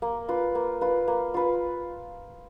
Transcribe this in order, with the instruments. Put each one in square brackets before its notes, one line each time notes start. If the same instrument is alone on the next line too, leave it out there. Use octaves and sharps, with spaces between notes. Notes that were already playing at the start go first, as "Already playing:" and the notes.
[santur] A#3
F4 B4
A#3
F4 B4
A#3
F4 B4